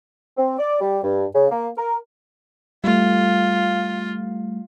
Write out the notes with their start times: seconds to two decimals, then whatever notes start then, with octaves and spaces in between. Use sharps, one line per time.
0.37 C4
0.58 D5
0.81 G3
1.03 G2
1.35 C#3
1.50 A#3
1.78 A#4
2.84 G3 A3 F4